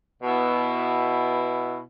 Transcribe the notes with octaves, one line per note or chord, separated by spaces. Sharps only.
B2 B3 E4